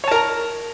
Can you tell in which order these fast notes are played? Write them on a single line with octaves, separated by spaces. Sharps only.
C#5 A5 A#4 A#5